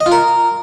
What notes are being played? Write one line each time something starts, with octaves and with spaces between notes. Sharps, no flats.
D#5
F4
A#4